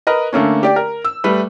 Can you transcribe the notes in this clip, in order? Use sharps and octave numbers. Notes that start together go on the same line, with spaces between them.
A#4 B4 D#5
D3 A3 A#3 C#4
G4 D5 G5
A#4
E6
G3 A3 B4